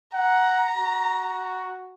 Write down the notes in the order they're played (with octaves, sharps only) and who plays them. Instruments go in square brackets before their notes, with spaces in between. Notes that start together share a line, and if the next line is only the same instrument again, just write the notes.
[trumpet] F#5 [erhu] A#5
[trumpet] F#4